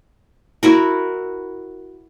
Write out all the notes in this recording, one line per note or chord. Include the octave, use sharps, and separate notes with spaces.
E4 F#4 A#4